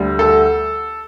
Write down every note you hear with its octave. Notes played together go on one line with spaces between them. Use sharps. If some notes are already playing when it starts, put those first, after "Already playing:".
Already playing: D2 D3 G3
A4